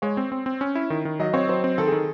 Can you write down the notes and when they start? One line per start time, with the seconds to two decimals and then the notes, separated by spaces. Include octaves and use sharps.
0.02 G#3 C#5
0.17 C4
0.32 C4
0.46 C4
0.61 C#4
0.75 E4
0.90 D#3
1.05 D#3
1.20 F#3 D#5
1.33 C4 C#5
1.49 F#3 C5
1.64 C4
1.78 D#3 A4
1.87 G#4
1.92 D#3